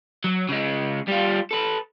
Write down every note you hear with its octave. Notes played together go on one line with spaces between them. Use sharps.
F#3
C#3 G#3
G3 F4
A4 B4